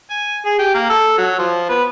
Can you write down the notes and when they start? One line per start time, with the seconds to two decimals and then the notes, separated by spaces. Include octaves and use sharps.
0.10 G#5
0.46 G#4
0.59 G4
0.75 A#3
0.90 A4
1.18 F#3
1.39 F3
1.69 B3